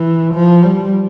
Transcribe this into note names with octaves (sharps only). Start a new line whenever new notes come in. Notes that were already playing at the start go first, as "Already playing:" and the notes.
Already playing: E3
F3
G3